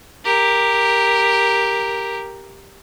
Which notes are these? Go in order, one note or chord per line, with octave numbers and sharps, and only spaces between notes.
G4 A#4